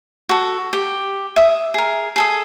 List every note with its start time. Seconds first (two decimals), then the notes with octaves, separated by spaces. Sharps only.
0.29 F#4 A4
0.73 G4
1.36 E5 D#6
1.74 G#4 A#4
2.16 G#4 A4 D#6